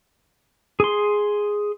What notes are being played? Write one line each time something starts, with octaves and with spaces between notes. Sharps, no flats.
G#4 C6